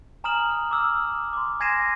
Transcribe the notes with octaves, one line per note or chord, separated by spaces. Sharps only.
G#5 A#5 D#6 F6 E7 F#7
D6 E6 F6
C6 D6
G#5 G#6 A#6 C7 D#7 E7